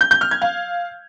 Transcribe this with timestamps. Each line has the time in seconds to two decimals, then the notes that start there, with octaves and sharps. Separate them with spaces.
0.01 G6
0.11 G6
0.21 F6
0.31 G#6
0.42 F5